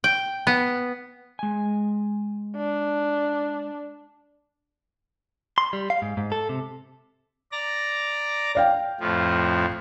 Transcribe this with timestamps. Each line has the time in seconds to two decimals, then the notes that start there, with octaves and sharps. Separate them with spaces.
0.04 G5
0.47 B3
1.39 G#3 G#5
2.56 D4
5.58 C6
5.73 G3
5.90 F5
6.02 G#2
6.17 G#2
6.32 A4
6.49 C3
7.52 D5 A#5 A#6
8.55 D5 F5 G5
9.00 F2 A2 F3